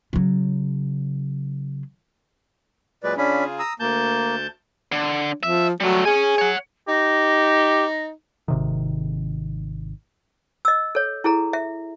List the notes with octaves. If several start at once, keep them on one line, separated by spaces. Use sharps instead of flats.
C#3 F#3
A#2 F#3 G#3 B4 D5
C#3 C#4 D4 F4 G#4 B5
A#5 D#6 E6
D2 A#3 A5 G6
D3
F3 E5
F#3 G3 A3
G#4 C#5 G#5
C#5 F#5
D#4 G4 A#6
G#1 C3 D#3
D#5 E6
A4 C#5
E4 G#4 A4 A#5
E5